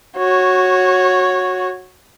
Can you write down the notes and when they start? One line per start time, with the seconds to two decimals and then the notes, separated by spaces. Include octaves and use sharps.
0.18 F#4 C#5